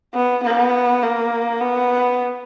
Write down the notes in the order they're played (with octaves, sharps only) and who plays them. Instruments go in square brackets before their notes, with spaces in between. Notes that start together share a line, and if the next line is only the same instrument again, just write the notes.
[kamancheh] B3
B3
A#3
B3